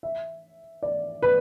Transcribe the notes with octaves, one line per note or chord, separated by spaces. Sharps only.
E5
D5
B4